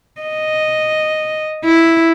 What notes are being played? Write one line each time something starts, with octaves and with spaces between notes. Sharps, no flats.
D#5
E4